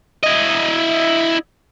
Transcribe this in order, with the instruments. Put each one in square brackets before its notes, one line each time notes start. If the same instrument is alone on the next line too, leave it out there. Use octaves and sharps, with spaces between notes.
[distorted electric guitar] E4 D#5